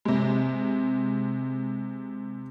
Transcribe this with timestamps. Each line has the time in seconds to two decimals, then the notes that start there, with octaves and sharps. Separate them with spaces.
0.05 C3 G#3